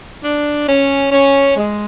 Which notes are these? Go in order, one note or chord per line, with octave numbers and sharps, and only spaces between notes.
D4
C#4
C#4
G#3